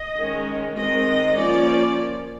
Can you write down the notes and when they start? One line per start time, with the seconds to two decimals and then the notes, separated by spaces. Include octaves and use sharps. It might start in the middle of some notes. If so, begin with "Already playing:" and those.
Already playing: D#5
0.19 D#3 G#3 C#4
0.78 D#3 G#3 C4 D#5
1.38 F3 A#3 C#4 D5